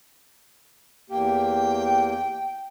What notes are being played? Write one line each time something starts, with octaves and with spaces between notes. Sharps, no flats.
E2 A#3 G4 G5